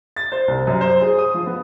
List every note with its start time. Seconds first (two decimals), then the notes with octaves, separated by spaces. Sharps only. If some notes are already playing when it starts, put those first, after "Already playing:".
0.17 A6
0.32 C5
0.48 C2
0.67 F#2
0.81 C5
1.01 G#4
1.19 D#6
1.34 F3
1.46 B3